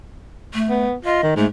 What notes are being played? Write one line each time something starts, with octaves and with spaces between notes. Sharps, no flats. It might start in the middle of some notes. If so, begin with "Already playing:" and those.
A3
B3
F4 D#5
D#3
G#2 A3